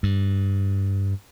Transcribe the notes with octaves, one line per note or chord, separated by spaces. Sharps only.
G2